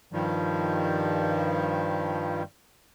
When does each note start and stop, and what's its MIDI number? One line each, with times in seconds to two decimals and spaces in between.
0.12 2.43 43
0.12 2.43 51
0.12 2.43 53
0.12 2.43 55